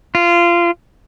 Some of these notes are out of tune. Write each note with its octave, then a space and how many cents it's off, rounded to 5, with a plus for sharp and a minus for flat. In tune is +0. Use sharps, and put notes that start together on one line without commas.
F4 -20